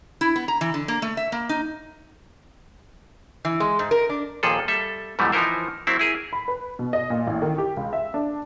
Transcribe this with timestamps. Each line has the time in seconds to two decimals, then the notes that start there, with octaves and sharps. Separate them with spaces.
0.21 E4
0.36 B3
0.48 A#5
0.61 E3
0.74 D3
0.88 A#3
1.02 A3
1.17 E5
1.32 A#3
1.49 D#4
3.45 E3
3.60 G#3
3.79 G#2
3.91 A#4
4.09 D4
4.43 D#2 A#2 F3 G#4 A4
4.68 G3 A4 E5
5.19 G#2 B2 E3 F3 G3 A3
5.32 E3 F3 D#4 E4 A#4 C5
5.87 F#3 A#3 C4 E4
5.99 E4 G#4 A#4
6.33 B5
6.48 B4
6.79 B2
6.93 D#5
7.10 A#2
7.27 A1
7.42 D#3
7.58 G4
7.77 C#2
7.93 E5
8.14 D4